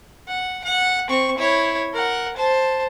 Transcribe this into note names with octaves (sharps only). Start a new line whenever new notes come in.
F#5
F#5
C4 C#6
E4 C#5
A#4 F#5
C5 A5